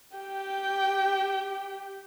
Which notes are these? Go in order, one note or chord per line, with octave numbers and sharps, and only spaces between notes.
G4 G5